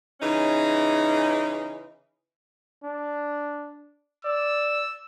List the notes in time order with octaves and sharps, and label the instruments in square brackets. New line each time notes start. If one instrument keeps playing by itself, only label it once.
[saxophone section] C#3 E3 C#4 D#4
[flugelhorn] D4
[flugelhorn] D5 [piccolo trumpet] E6